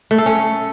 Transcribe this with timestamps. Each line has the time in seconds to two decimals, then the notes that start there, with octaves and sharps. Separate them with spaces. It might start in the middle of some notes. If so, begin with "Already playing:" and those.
0.11 A3
0.18 A4
0.26 C#4